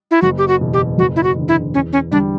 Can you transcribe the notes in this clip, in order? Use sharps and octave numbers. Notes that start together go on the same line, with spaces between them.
E4
F#1 F#4
G4
F#4
E2 B2
G4
F#1 F#4
E4
F#4
E2 D3
E4
E2 C#4
C#4
D3 G3 D4